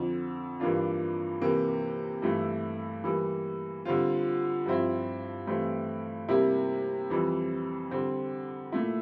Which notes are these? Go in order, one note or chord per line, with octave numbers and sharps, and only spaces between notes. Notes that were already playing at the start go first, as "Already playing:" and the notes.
Already playing: F2 D3 F3
G2 E3 A#3 D4 F4
C3 E3 A#3
G2 E3 A3 E4
E3 G3 A#3
D3 G3 C4 F4
G2 F3 C4 E4
G2 E3 A3 C4 E4
C3 G3 A#3 E4
F2 E3 G3
D3 G3 C4
A#2 A3 E4